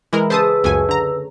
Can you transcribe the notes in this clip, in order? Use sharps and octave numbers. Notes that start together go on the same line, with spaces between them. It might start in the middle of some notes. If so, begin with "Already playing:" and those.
E3 G#3 E4 A#4
C#3 G#4 A4 B4 C5 A5 D#6 E6
C#2 F#2 C#3 A3 G#5
D3 A#5